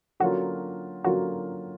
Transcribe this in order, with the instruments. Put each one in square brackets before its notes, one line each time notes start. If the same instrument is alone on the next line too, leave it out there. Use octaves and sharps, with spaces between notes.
[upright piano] D3 F#3 A#3 C#4 F4 [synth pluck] F#4
[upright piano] D3 F#3 A#3 C#4 F4 [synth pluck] F#4